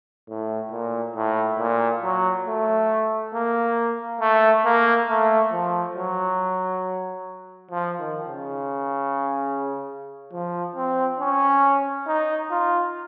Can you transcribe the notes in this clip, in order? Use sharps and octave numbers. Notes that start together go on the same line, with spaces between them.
A2
A#2
A2
A#2
F#3
A3
A#3
A3
A#3
A3
F3
F#3
F3
D#3
C#3
F3
C4
C#4
D#4
F4